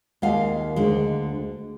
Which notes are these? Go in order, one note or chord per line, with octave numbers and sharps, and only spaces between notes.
D#2 D#3 G#3 F5
D2 D3 G#3